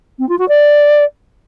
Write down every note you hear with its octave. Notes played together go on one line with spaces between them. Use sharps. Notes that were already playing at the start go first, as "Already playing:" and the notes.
C4
F4
F#4
D5